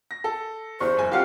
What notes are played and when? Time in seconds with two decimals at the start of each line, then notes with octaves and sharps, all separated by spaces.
0.11 A#6
0.24 A4
0.80 E2 C5 C#6
0.97 F#1 G#5
1.12 C4 F4 G4 F5 F#5